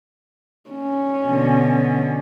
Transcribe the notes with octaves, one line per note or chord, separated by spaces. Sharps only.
C#4
B2 D3